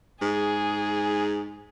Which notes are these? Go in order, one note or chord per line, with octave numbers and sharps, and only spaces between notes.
G#2 G#4